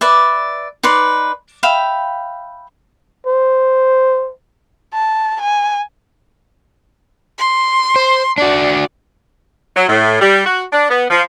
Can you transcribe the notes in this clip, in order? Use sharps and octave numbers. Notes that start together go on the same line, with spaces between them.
B4 D5 E5
D#4 B4 D5 C6
E5 F5 G5 B5
C5
A5
G#5
C6
C5
D4 F#4 D5
F#3
A2
G3
F#4
D4
B3
F3